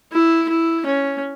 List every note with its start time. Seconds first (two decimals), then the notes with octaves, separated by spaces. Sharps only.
0.12 E4
0.49 E4
0.86 C#4